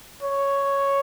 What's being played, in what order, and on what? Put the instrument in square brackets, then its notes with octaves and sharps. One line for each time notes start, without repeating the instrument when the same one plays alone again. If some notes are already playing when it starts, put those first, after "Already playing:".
[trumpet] C#5